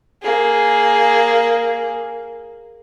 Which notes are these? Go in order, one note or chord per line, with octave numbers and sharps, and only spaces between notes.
A#3 G#4